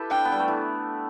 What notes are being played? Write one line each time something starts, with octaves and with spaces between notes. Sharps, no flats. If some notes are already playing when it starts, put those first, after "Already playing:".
Already playing: E4 G4 A4 B4
D4 G5
B3
G3
A3
E3